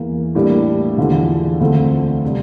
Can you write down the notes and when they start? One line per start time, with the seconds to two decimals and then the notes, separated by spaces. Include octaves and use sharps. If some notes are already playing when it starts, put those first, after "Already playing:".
Already playing: E2 E3 A#3
0.35 A2 G3 A#3 D4 G4
0.98 E2 D3 F3
1.60 D2 D3 F3 A3 C4
2.25 C3 G3